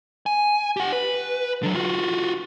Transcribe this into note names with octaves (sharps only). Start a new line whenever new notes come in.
G#5
G4 F#5
B4
D3 F#3
F4 F#4